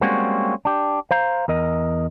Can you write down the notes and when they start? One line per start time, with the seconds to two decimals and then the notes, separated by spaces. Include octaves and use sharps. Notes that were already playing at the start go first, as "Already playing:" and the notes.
0.01 G3 G#3 A#3 C4 C#4 F#4
0.65 D4 G4
1.11 C5 F5 A#5
1.48 E2 A#4 D#5